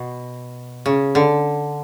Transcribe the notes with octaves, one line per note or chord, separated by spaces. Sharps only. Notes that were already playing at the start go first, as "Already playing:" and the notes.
Already playing: B2
C#3
D3